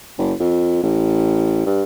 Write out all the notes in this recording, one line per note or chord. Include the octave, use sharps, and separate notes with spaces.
F#1
F2
A1
G2